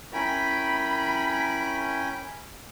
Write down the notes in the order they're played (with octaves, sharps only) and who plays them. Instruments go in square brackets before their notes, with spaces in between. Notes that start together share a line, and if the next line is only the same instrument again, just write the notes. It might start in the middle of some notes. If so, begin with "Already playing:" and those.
[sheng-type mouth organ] C#4 G5 G#5 [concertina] E4 A#4 [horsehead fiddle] B5